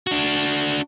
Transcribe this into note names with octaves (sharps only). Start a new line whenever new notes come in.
D4 F#4